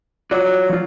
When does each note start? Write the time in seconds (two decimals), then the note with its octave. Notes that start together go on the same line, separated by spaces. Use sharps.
0.31 F#3 F4 F#4 D5
0.69 F3 F4